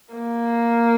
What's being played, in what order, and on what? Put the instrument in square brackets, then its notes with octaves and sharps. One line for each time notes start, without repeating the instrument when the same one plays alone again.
[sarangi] A#3